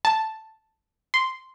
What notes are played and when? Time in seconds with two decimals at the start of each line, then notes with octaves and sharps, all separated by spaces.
0.05 A5
1.14 C6